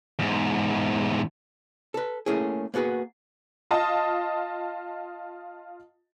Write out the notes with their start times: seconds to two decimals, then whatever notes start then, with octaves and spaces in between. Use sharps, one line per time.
0.19 E2 G#2
1.94 A4 B4
2.26 A3 A#3 C#4 E4 G#4
2.74 A#3 B3 F#4 G#4 B4
3.71 F4 D#5 A5 D#6